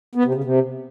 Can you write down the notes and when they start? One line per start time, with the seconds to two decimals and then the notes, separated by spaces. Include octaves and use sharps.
0.15 B3
0.25 C3
0.34 C#3
0.44 C3